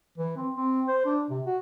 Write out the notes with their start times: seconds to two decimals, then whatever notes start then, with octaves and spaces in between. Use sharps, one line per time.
0.18 E3
0.36 C4
0.56 C4
0.88 C5
1.06 D4
1.30 C3
1.46 F#4